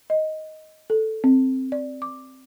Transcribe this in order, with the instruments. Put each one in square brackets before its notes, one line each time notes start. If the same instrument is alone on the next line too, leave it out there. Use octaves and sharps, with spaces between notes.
[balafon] D#5
A4
C4
D5
D6